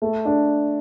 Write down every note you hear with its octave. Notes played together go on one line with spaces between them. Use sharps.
A3
D4